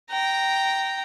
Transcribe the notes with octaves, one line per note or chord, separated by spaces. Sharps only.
G5 A#5